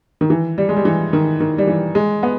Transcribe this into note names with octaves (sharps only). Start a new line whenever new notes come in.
D#3
E3
G3
G#3
G3
E3
D#3
D#3
G3
E3
G#3
B3